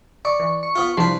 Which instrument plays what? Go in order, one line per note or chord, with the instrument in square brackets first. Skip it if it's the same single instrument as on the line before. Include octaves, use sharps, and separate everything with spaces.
[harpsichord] D5 [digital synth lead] C#6
[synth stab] E3
[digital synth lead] C#6
[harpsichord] B3 F4
[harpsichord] C2 B4 [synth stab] F3 D4 [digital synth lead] C6